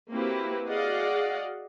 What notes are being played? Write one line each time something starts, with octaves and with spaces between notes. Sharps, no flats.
A#3 C4 E4 F#4 G4 B4
F#4 G#4 D5 D#5 F5 F#5